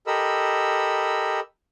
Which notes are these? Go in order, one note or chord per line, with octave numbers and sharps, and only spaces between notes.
G4 A4 A#4 D#5 B5 E6